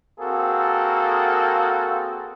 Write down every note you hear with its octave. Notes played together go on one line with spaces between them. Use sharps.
A#3 C4 F#4 G#4 A4